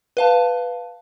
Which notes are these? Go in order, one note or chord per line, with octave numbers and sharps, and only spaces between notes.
B4 F5 A5